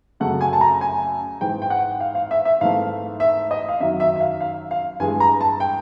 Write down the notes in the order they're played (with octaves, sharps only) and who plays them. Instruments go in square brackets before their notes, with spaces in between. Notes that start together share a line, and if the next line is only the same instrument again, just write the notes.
[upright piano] F#2 C#3 F#3 A3 F#5
G#5
A5
A#5
G#5
G#2 E3 G#3 G5
G5
F#5
F5
F5
E5
E5
G#2 E3 A3 F5
E5
D#5
F5
F#2 D#3 F#3 E5
E5
E5
F5
F5
F5
G2 E3 G#3 G#5
A#5
A5
G5